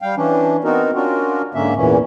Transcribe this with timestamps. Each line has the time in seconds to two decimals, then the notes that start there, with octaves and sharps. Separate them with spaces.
0.02 G3 F5 G5
0.17 E3 C#4 D4
0.64 B3 C4 D#4 F#4 A#4
0.95 C#4 D4 F4 F#4 A#4
1.54 G#2 D3 A#3 C#4 E5
1.77 E2 A#2 E3 C#4